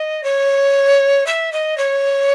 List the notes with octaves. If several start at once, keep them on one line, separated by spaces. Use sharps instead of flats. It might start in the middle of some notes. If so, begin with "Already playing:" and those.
Already playing: D#5
C#5
E5
D#5
C#5